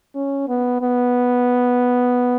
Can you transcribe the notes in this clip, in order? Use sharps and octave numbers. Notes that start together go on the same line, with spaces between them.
C#4
B3
B3